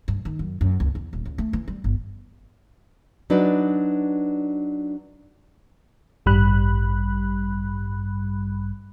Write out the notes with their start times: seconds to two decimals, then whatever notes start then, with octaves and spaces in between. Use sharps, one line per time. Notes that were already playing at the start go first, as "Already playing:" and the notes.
0.08 G2
0.25 D#3
0.39 F#2
0.61 F#2
0.80 C#2
0.95 E2
1.13 D#1
1.26 C#2
1.38 A3
1.53 E3
1.68 G3
1.84 G1
3.30 F#3 D4 D#4 B4 D5
6.26 A1 G2 G3 B5 F#6